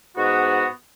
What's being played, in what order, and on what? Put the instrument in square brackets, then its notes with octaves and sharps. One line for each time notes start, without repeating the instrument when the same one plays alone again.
[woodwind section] G#2 B3 F#4